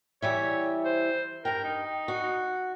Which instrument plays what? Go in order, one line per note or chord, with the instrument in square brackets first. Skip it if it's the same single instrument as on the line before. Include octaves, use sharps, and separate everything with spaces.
[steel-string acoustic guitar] E3 G3 E5 [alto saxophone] C#5
[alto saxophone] C5
[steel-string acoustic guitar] G2 G5 [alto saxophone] A#4
[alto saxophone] D#4
[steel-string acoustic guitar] F#4